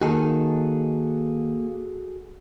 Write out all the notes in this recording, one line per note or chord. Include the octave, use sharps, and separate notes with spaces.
D#3 A#3 D#4 F#4 G#4 A4